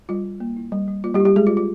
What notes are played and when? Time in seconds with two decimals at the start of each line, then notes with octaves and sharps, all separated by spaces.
0.09 G3 F4
0.24 G3
0.40 A#3
0.56 E4
0.72 G3
0.88 G3
1.04 A#3 F4
1.14 G3 G4
1.20 E4
1.25 G3 G4
1.36 G#3 E4 G#4
1.47 F4
1.51 G#3
1.57 F4